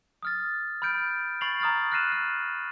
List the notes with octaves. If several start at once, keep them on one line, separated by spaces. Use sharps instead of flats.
D#6 F6 A6
B5 F6 G6 D7
B5 C#6 A6 C7 F7 F#7
A#5 D#6 F6 A6
F6 F#6 A#6 C7 D#7 E7
F6